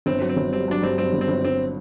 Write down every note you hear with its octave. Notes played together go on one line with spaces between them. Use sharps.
G1 C4
F#3
C4
G1
G2 C4
F#3 D4
G2 C4
G2 C4
G1
C4
G1
G1 C4